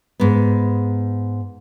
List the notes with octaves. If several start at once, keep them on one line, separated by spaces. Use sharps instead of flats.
G#2 B3